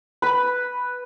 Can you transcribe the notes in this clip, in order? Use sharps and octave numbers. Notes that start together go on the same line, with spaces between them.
B4 B5